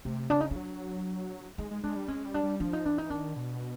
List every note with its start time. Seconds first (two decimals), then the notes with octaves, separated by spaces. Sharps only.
0.05 C3 A3
0.30 C#3 D4
0.40 D#4
0.51 D4
0.56 F#3
1.58 G#3 D#4
1.71 G#3
1.83 G#3 D4
1.96 G3
2.08 G#3 C#4
2.25 G3
2.34 D4
2.43 G3
2.60 F3 D4
2.73 D#4
2.85 E3 D4
2.98 D#4
3.10 D#3 D4
3.36 B2